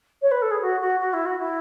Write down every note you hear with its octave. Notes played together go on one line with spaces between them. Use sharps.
C#5
B4
A4
G#4
F#4
F#4
F#4
E4
F#4
E4